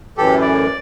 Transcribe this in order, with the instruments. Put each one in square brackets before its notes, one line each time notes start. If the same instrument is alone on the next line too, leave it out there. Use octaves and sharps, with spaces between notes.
[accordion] F#2 A2 E3 [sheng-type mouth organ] G4 A4
[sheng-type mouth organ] D5